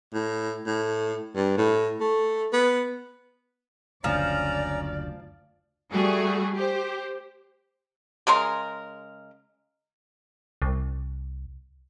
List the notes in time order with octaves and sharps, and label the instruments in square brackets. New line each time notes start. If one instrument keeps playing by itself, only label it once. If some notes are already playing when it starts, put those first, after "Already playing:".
[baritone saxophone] A2
A2
G2
A2
A3
B3
[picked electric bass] F#1 D2 [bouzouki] F3 [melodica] C#4 A#5 [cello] D5
[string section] G3 A3 F#4 G#4
G4 C5
[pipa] C#3 G#3 A#4 C6
[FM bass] C2